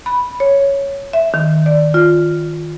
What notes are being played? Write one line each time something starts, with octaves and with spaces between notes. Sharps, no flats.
B5
C#5
E5
D#3
D5
F4